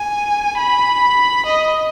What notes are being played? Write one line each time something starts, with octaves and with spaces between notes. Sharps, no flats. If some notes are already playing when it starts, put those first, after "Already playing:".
Already playing: G#5
B5
D#5